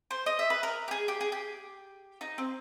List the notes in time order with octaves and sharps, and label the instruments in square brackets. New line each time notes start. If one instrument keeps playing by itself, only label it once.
[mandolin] C5
D#5
E5
B4
A#4
G4
G#4
G4
G#4
G4
D#4
C4